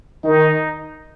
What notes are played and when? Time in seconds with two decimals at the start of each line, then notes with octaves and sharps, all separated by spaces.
0.24 D#3 D#4